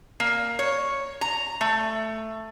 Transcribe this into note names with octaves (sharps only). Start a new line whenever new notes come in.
A#3
C#5
A#5
A3